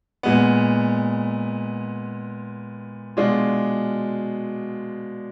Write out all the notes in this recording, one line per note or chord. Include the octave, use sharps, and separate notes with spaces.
A#2 G#3 B3
B2 G#3 D4 F4